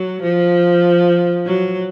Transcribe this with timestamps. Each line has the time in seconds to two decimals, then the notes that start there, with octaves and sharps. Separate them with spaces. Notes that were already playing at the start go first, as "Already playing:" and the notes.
Already playing: F#3
0.22 F3
1.46 F#3